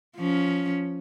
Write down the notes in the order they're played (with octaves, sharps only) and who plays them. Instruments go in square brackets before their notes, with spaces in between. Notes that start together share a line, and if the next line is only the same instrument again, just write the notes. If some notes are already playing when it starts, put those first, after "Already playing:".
[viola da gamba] F3 C#4